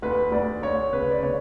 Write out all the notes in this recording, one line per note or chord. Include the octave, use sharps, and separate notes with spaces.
D2 B4
D2 D5
D2 C#5
C#3 B4
D5
C#3 C#5